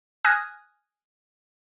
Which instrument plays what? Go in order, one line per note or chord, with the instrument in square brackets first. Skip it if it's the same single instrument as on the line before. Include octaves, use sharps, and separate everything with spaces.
[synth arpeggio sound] G#5 D#6 F6 F#6 G#6 A#6